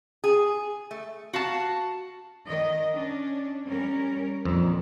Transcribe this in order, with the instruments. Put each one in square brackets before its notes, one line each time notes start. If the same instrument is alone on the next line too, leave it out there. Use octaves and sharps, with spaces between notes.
[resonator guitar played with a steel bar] G#4
A3
F#4 F5 A5
[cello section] D#3 D#5
C#4 D4
G3 C#4 A#4
[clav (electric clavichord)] F2 [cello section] A#2 D#3